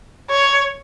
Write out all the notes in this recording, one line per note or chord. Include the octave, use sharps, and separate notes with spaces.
C#5